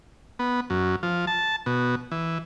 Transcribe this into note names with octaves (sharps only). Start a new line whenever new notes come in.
B3
F#2
F3
A5
B2
E3